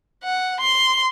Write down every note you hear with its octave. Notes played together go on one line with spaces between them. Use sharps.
F#5
C6